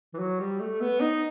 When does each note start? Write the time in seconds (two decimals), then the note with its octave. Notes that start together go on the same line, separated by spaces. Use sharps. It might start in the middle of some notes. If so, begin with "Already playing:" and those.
0.14 E3
0.19 F#3
0.40 G3
0.60 A3
0.81 B3
1.01 D#4